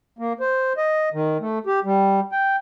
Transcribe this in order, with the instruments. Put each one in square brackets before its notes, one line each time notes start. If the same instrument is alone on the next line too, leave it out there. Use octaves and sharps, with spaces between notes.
[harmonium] A#3
C5
D#5
D#3
A3
G4
G3
G5